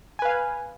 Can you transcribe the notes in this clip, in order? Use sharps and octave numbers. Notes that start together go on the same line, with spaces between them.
B4 F5 G#5